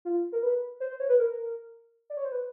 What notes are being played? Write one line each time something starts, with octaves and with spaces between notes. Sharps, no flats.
F4
A#4
B4
C5
C5
C#5
B4
A#4
D5
C#5
C5
B4